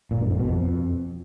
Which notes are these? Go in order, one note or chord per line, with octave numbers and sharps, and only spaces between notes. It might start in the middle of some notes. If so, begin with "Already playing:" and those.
A#2
G2
F2
B2
F2